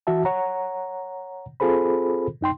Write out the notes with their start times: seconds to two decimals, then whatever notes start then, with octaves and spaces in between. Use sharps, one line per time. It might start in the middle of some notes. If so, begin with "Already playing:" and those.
0.07 E3 F#4 E5 A5
0.25 C#5 F#5 A#5
1.60 C4 F4 G#4 A4 C5 B5
2.41 F#2 D#4 G5 C6